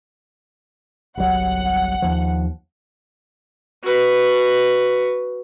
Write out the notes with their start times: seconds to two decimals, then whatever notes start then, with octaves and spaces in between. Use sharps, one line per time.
1.17 G1 C2 F#3 F#5
2.02 D#2 F3
3.84 F#4 B4